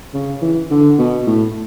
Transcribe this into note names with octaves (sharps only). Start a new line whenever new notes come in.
C#3
E3
D3
B2
A2